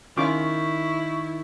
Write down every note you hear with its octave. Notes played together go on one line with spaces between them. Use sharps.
D#3 C#4 E4 F4 C#6 D6